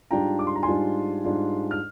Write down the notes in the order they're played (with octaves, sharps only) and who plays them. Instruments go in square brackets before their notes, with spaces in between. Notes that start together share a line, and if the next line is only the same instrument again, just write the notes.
[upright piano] G#2 G3 D4 F4 G5 A#5
D6
C6
A#5
G#5 C6
G#2 G3 D4 F4
G#2 G3 D4 F4
F6